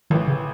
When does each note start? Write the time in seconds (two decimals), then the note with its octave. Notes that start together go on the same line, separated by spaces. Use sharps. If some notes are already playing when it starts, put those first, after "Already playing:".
0.10 A1 A2 D#3 E3
0.28 C#3